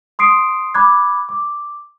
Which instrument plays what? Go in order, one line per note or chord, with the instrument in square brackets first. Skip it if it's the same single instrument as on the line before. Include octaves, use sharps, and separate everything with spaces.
[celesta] C6 D#6 C7 D7
B5 D6 F#6 G#6
D6